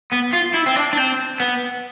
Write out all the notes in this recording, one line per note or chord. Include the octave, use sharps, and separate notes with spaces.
B3
F4
E4
C4
D4
D4
C4
B3